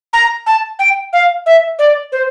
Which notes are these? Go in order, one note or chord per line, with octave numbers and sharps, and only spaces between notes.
A#5
A5
G5
F5
E5
D5
C5